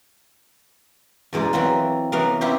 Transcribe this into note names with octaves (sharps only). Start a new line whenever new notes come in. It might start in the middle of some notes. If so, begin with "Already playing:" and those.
E2 B2 G#3 D#4 D5
E3 F#3 A#3 C4 F4
C3 E3 F#3 B3 A#4 F5
B3 C4 E4 F4 G4 C5